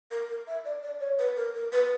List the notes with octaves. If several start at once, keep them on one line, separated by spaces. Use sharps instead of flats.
A#4
A#4
E5
D5
D5
C#5
B4
A#4
A#4
B4